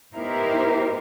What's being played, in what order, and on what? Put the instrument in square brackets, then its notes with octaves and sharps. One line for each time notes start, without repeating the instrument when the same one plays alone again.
[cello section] B3 D#4 E4 G4 A#4 C5